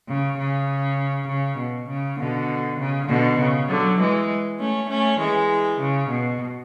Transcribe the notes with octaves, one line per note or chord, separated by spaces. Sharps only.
C#3
C#3
C#3
B2
C#3
B2 D3
C#3
B2 D3
C#3
D3 F#3
E3 G#3
A3 C#4
A3 C#4
E3 G#3
C#3
B2